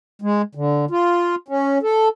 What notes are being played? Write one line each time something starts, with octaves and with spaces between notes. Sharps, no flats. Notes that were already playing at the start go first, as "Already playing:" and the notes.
G#3
D3
F4
C#4
A4